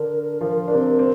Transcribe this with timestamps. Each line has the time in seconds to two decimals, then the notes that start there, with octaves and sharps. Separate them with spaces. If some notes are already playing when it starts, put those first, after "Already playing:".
Already playing: D3 D4 A#4
0.41 F3 F4
0.68 D4
0.74 C3 C4
0.99 C4